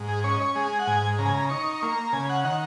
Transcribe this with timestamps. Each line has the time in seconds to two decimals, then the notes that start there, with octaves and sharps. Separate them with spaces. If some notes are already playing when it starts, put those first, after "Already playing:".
Already playing: G#2
0.09 G#4
0.24 C#4 C#5
0.34 D#5
0.41 C#5
0.55 G#3 G#4
0.79 F#5
0.87 G#2 G#5
1.19 C#3 A#5
1.26 G#5
1.34 A#5
1.50 D#4 C#6
1.81 A#3 C#6
1.97 A#5
2.13 C#3 G#5
2.29 F#5
2.44 D#3 F#5